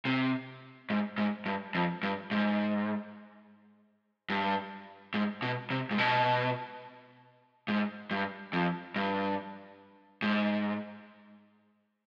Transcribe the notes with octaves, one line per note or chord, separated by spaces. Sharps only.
C3
G#2
G#2
G2
F2
G2
G#2
G2
G#2
B2
C3
G#2
B2
G#2
G2
F2
G2
G#2